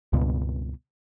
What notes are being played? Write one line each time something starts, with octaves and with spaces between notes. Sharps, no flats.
C#2 G2 B2